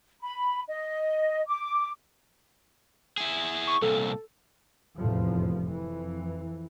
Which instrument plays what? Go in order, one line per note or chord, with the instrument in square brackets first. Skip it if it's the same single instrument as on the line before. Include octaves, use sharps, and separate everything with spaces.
[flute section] B5
D#5
D6
[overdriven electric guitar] E4 G#4
[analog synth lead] C#6
[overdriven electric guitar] C2 A#2 [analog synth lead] A4
[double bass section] F1 E2 A2 F3
F2 E3